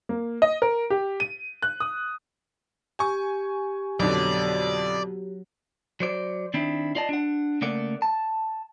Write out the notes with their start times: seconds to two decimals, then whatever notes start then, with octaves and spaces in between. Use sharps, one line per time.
0.09 A#3
0.42 D#5
0.62 A#4
0.90 G4
1.20 D#7
1.62 F#6
1.80 D#6
2.99 G4 G#5 C#6
4.00 F2 B2 D3 F#3 D5
6.00 F#3 C5 D5
6.54 D#3 C4 D4 E4
6.95 F4 D5 D#5 A5
7.09 D4 F#5
7.61 C#3 A3 A#3 D5 F#5
8.02 A5